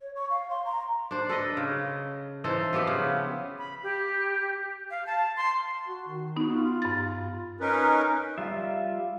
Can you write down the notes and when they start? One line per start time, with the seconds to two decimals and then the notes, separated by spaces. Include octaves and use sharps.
0.01 C#5
0.16 C#6
0.30 F5
0.50 C6
0.65 A#5
1.11 D4 C5
1.29 A4 B4 D#5
1.57 C#3
2.44 E3 D#4 A4 C5
2.73 F3 B3 G4 E5
2.87 C#3
3.58 B5
3.83 G4
4.91 F5
5.07 A5
5.37 C6
5.87 F#4
6.08 D#3
6.36 B3 D#4 F#4
6.56 F4
6.82 G2 A6
7.61 C#4 D#4 A#4 B4
8.38 G3 F4 E5